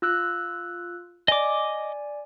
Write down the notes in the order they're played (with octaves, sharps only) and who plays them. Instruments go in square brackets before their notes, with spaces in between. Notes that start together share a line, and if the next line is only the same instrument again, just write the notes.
[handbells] F4 E6 F#6
[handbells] D5 G#5 [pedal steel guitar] D#5 D6